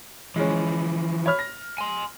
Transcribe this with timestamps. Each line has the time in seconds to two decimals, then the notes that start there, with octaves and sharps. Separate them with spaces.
0.36 E3 F3 G#3 C#4
1.26 C#5 B5 F6
1.39 A#6
1.78 G#5 C6